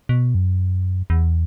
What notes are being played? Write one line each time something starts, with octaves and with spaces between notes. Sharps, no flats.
B2
F#2
E2